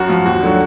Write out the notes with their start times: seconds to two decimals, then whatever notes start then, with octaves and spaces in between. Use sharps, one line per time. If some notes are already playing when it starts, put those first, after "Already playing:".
Already playing: F#2 F#4
0.09 F3
0.26 D#2 F#4
0.43 D3 F#3